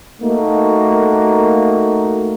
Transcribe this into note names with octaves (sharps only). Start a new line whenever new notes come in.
A3 A#3 D#4 F#4